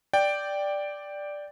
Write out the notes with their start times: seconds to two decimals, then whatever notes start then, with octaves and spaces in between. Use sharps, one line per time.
0.13 D5 G5